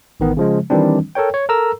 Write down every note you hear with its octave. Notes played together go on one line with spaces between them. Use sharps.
A1 D#3 B3
C#3 F3 G#3
D#3 E3 G3 C4 D4
A4 A#4 C#5 G5
C#5
A4 A#4 A#5 E6